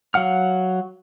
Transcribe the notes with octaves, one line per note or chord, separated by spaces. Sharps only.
F#3 F5 F#5 F6